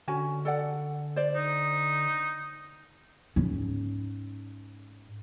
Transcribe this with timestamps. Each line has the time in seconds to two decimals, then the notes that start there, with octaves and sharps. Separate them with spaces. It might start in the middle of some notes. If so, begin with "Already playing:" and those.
0.08 D3 C#4 F#4 G#5
0.45 A4 D5 F#5
1.16 C5 D5
1.35 D#4
3.36 G#2 C#4